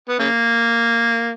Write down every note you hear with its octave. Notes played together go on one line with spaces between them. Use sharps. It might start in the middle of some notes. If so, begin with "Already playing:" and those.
B3
C#3 A#3